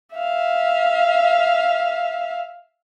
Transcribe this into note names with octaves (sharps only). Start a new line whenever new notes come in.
E5 F5